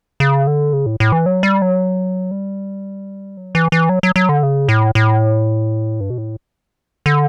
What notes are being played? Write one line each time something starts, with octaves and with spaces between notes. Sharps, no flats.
C#3
D3
C#3
A2
A2
E3
F#3
G3
F#3
G3
F#3
E3
E3
F#3
F#3
F#3
D3
C#3
A2
A2
G2
B2
A2
D3